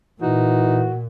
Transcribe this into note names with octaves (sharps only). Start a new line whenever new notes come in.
A#2 E3 D#4 F#4